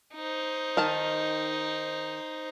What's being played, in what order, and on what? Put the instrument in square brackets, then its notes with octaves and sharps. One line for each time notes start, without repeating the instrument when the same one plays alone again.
[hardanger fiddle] D#4 C5
[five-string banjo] D#3 A#4 A5